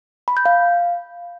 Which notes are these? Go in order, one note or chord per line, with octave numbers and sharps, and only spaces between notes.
B5
G6
F5